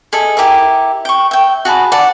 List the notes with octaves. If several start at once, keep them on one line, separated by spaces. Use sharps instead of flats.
G#4 A4 D#5 E5
E4 G4 A#4 E5
G5 C#6
E5 G5
F#4 G#4 A5 B5
D5 F#5 A5